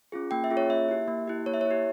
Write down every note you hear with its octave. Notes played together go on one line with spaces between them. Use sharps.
C#4 F4 G#4
A#3 G5
E5
C#4 F4 G#4
C#5
A#3 E5
E4 G4
A#3
E4 G4
A#3 C#5
E5
E4 C#5
G4